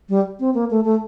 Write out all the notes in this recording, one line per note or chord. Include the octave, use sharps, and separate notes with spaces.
G3
C4
A#3
A3
A3